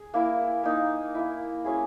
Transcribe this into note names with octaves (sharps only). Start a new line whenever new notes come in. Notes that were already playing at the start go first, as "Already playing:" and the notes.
Already playing: G#4
A#3 E4
A#3 D#4
A#3 E4
F#3 C#4 E4 G#4